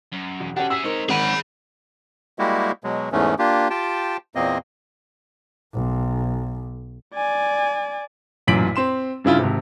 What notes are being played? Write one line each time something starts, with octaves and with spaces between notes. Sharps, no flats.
F#2
E1
C#4 D4 F#4 G4 A4 F#5
E4 G#4 E6 B6
G#3 C4 D#4 A#4 C#5
G#1 A#3 C#4 G#4 F#5 B5 D#7
G3 G#3 A#3 E4 F#4 G4
B2 F#3 G#3
E2 G#2 E3 A3 C#4
A#3 D4 F4 G4
F4 G4 G5 A5
E2 A#2 A#3 C4 D#5
B1
D5 G#5
A1 F#2 A#2 B6 D7 F#7
C4 C6 E7
G2 C#3 E4 F4
G#1 C3